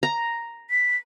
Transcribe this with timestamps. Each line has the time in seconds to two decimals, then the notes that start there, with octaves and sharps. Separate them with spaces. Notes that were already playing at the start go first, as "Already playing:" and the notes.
0.03 A#5
0.70 B6